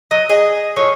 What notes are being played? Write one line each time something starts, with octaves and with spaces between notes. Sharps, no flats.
F#3 D#5
G#4 D#5
A2 F3 F#3 C#5